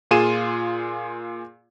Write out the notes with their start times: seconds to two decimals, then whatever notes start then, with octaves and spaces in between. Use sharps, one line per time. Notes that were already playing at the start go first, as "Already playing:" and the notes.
0.11 A#2 F4 G#4 D#7 E7